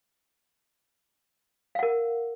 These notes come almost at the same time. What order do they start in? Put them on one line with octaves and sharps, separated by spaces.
F5 F#5 A#4